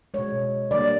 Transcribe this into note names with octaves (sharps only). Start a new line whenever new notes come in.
B2 G#3 C#5
D3 G3 A#3 D5